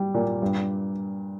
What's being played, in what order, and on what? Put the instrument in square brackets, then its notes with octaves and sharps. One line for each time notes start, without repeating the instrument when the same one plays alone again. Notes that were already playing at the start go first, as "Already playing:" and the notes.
Already playing: [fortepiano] G3
A#2
G2